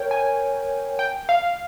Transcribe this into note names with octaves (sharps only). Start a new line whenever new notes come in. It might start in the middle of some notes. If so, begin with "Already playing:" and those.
Already playing: A#4 C#5 G5
G#5
G5
F5